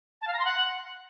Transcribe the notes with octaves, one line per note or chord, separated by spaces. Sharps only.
A5
F5
A#5
C6
F#5